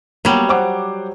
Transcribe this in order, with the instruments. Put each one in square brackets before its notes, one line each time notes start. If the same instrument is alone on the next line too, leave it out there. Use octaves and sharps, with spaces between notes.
[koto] F#3 G3 [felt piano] A#3 B3
[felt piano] C5 F#5 D6